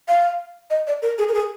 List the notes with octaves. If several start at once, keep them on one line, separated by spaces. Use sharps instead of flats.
F5
D#5
D5
A#4
G#4
A#4
G#4